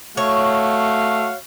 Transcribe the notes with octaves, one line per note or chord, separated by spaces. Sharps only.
A3 F#4 C#5 F5